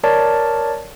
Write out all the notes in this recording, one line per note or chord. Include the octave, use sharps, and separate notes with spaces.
A#4 C#5 D5 A5